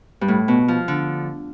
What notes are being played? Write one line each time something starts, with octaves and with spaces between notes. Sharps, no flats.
G2
A2
B2
F3
D3